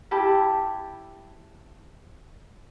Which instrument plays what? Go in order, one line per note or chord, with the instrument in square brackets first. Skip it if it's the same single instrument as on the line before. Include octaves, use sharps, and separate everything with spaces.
[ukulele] E4 G4 A5 B5